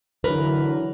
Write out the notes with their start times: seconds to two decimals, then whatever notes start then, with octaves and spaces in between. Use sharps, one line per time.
0.24 D3 E3 F#3 A#4 B4